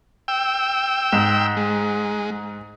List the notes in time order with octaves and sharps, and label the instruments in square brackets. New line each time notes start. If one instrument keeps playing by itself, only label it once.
[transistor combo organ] G5 E6
[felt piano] G#2 E7
[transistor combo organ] G#3